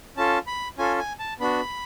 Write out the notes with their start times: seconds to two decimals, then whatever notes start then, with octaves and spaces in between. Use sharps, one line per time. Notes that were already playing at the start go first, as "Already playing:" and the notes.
0.17 C#4 F4 A4 A5
0.47 B5
0.78 C#4 F4 A4 G#5
0.99 G#5
1.19 A5
1.40 B3 D4 F#4 B5